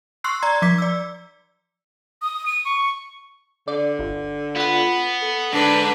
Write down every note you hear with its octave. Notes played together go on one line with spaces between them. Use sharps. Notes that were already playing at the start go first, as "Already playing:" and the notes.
C6 C#6 E6 F#6 C7
D5 A#5 G#6
F3 D6 B6
D5 E6
D#6
D#7
C#6
D3 D5
G1
B3 F4 F#5
A4
G#2 D3 D4 B4